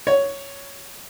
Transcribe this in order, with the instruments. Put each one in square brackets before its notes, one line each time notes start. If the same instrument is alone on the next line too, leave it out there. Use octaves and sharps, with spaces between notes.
[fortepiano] C#5